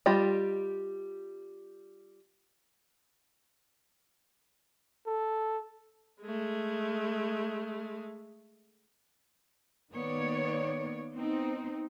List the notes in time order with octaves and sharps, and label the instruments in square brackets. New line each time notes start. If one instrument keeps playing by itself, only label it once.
[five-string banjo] G3 F4 G4 D#5 B5
[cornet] A4
[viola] G#3 A3
[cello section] D#3 A#3 B3 C#5 D5
B3 C4 D#4